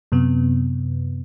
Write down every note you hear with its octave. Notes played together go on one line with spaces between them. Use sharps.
F#2 C3 B3